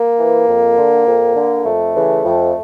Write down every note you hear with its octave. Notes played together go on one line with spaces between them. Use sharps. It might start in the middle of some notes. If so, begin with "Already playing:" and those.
Already playing: A#3
E3
F2
D3
F2
D3
F2 A3
C#3 E3
F2